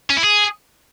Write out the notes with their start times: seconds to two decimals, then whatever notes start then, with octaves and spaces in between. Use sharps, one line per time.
0.10 C#4
0.17 E4
0.24 G#4